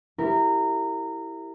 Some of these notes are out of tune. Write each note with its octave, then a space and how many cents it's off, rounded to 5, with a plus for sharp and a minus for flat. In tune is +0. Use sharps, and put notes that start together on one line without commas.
E4 +0 G4 +0 A#4 -20